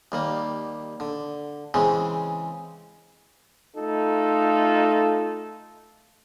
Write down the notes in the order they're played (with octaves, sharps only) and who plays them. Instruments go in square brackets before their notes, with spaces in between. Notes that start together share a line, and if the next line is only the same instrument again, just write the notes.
[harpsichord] D#2 G3 A#3
D3
C#3 E3 G#3 C4
[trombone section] A3 D#4 F4 A4